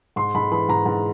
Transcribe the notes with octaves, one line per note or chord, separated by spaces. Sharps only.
G#2 C6
G#2 B5
E3 B5
G#2 A#5
G#2